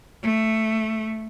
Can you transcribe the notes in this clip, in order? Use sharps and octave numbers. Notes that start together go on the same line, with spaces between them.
A3